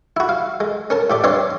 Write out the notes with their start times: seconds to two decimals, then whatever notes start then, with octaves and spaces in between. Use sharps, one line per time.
0.17 E4 F#4
0.29 F5
0.60 G#3
0.90 C#4 A#4 A5
1.10 A2 G4 D5
1.24 G2 G3 C4 C#5 D5 C6